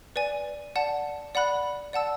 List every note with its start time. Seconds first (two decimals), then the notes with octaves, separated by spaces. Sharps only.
0.16 B4 D5 G#5
0.76 D5 F#5 A5
1.35 D5 F#5 B5 F#6
1.93 D5 F#5 A5 E6